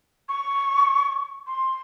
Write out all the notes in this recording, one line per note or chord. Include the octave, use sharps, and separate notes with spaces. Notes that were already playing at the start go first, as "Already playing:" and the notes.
C#6
C6